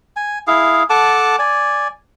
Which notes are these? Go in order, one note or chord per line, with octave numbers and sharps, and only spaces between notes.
G#5
E4 G#4 F5
A4 F#5 A5 D6
D5 G#5